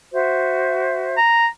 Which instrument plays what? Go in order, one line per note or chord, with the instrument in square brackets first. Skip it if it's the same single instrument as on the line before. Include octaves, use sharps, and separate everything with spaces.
[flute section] F#4 C5 E5
[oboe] A#5